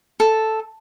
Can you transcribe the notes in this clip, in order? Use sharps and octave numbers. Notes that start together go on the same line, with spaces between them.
A4